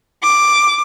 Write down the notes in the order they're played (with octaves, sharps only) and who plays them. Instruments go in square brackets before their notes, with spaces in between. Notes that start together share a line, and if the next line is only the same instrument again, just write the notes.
[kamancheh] D6